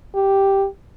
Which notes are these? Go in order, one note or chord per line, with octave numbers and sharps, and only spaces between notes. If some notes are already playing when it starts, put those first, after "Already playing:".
G4